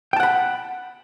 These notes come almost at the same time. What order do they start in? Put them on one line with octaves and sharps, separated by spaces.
G5 A5 F#5 B5